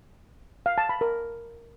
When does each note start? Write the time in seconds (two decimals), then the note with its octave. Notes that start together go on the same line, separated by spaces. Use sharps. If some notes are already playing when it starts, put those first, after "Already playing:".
0.66 F5
0.78 A5
0.89 B5
1.01 A#4